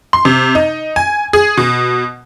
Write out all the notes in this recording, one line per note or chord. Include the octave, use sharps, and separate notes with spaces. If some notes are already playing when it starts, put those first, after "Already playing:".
C6
C3
D#4
G#5
G#4
B2